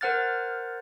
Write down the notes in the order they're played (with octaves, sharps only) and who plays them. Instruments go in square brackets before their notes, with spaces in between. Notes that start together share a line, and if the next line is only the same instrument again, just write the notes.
[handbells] A#4 C5 F#5 F6 F#6 A6